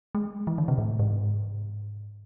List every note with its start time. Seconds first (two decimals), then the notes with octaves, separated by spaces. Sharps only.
0.15 G#3
0.47 E3
0.58 D3
0.68 C3
0.78 A2
0.99 G#2